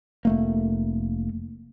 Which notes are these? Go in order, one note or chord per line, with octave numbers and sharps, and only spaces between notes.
F1 A3 A#3